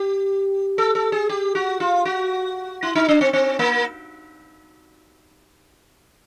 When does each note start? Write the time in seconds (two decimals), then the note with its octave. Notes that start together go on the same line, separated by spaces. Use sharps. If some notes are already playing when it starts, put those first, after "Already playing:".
Already playing: G4
0.78 A4
0.95 A4
1.12 G#4
1.29 G4
1.55 F#4
1.80 F4
2.05 F#4
2.83 E4
2.95 D#4
3.09 D4
3.21 C4
3.33 C4
3.59 A#3